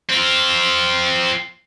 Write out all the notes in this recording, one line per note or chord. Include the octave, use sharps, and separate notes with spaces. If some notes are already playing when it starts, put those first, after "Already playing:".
C4 F4